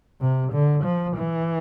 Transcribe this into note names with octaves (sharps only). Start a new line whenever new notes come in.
C3
D3
F3
E3